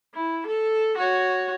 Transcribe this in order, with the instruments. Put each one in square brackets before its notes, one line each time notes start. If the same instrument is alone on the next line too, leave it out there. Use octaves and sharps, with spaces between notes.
[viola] E4
A4
F#4 C#5